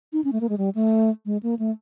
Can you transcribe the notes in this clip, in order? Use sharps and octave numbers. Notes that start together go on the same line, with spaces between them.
D#4
C#4
A3
A#3
G#3
G3
A3
G#3
A#3
A3